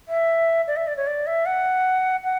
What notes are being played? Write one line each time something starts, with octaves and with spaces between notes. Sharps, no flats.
E5
D5
E5
D5
C#5
D5
E5
F#5
F#5